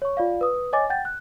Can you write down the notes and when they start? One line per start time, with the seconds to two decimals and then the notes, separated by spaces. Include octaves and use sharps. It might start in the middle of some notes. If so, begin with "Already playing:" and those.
0.02 C#5 C#6
0.17 F4 D5 F5
0.41 B4 D#6
0.73 C#5 D#5 G#5 D6 A6
0.90 F#5 G5 G6 A6
1.05 F#6